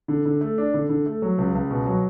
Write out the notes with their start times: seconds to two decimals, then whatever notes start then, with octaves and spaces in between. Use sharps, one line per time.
0.08 D3
0.25 D3
0.41 A3
0.58 D4
0.74 D3
0.89 D3
1.06 A3
1.22 F#3
1.38 C#2
1.55 C#2
1.70 B2
1.86 F#3